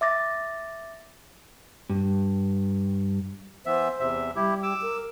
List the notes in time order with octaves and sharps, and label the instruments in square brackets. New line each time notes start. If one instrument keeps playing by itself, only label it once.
[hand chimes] E5 D6 A6 A#6
[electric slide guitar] G2
[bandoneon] E3 B3 E5 [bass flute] C5
[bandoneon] E2 C3 E5
[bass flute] G3 [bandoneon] E4 G4
[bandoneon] D6 E6
[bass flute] A#4